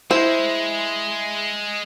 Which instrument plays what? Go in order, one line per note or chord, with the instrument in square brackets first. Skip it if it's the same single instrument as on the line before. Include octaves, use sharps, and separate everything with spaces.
[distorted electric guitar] G#3 [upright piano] E4 [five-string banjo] C5